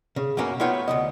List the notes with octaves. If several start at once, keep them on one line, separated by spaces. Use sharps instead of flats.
C#3
F#2 B2 F#3 A#3 C#4
F#3 A3 B3 F4 C#5 G5
D2 C#3 D#5